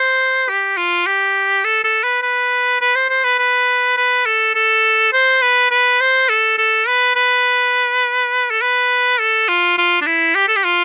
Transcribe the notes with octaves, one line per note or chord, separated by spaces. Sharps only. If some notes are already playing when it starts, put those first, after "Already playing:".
Already playing: C5
G4
F4
G4
A4
A4
B4
B4
B4
C5
C5
B4
B4
B4
A4
A4
C5
B4
B4
C5
A4
A4
B4
B4
A4
B4
A4
F4
F4
D4
E4
G4
A4
G4
F4